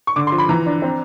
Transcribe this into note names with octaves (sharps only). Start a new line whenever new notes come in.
C#6
D3 D6
C6
F3
B5
E3 A#5
D4
C4